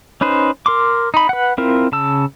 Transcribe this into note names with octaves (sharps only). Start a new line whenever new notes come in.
C#4 D#4 B4 C5
A#4 C6 D6
D#4 B5
B4 F#5
C4 E4 F4 A#4
C#3 A5 E6